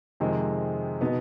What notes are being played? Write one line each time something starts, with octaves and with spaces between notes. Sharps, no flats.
F2 C3 D#3 G#3 C4
B2 B3 D#4